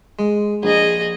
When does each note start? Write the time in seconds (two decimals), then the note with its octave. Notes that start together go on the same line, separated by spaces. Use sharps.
0.19 G#3
0.63 A#1 G#4 D#5